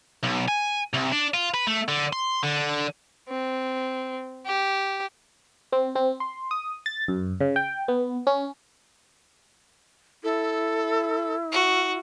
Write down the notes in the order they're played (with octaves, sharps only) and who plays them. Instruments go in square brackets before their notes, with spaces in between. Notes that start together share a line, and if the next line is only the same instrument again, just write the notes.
[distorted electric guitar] B1
G#5
C2
D4
F4
B4
A3
D3
C6
D3
[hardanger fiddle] C4
G4
[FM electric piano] C4
C4
C6
D#6
A6
F#2
C#3
G5
B3
C#4
[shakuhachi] E4 [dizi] A4
[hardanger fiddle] F#4